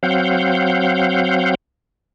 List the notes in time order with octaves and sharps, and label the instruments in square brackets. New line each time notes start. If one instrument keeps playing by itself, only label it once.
[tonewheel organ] F#3 C4 F5 F#5 G6